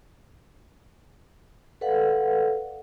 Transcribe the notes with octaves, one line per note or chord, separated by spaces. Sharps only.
A4 B4 D5 F5 F#5